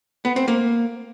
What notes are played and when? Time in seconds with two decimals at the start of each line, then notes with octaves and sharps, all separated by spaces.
0.25 B3
0.36 C4
0.48 A#3